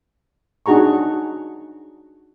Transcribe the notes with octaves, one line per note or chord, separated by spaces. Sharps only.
D4 D#4 F#4 G#4 A#5 C#6